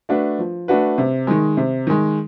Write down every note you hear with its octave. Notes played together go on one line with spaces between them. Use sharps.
A3 D4 F#4 B4
F3
A3 D4 F#4 B4
C3
D#3 G#3
C3
D#3 G#3